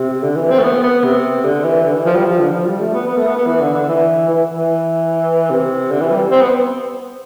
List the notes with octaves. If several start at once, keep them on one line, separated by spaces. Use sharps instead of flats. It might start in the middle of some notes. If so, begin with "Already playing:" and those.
Already playing: C3
D3
E3
C4
A3
B3
B3
C3
D3
E3
D3
E3
F3
G3
F3
D3
F3
G3
A3
B3
B3
A3
B3
B3
E3
D3
D3
E3
E3
E3
C3
D3
E3
G3
C4
B3